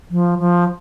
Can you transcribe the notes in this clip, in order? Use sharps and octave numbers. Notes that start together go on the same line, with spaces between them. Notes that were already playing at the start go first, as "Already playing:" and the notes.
F3
F3